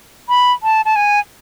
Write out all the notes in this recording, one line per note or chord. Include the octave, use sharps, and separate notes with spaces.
B5
A5
A5
G#5